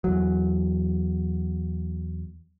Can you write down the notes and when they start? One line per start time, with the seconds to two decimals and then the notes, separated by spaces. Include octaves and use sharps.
0.04 E2 F#3